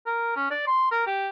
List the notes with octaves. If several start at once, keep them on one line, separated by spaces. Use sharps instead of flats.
A#4
C#4
D5
C6
A#4
G4